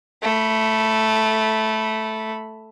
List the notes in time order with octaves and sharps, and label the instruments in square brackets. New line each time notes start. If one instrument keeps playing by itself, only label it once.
[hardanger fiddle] A3 B5